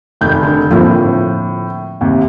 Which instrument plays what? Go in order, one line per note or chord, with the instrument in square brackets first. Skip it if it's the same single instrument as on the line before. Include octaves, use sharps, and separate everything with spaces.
[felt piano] F1 D#3 G6
[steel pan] D3
[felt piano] A2 [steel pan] F3 A#3 C4
[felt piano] D#2 C3